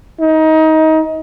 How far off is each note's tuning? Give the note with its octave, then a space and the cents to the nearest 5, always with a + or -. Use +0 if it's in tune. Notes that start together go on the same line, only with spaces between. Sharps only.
D#4 +20